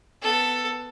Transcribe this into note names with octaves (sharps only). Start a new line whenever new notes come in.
B3 A4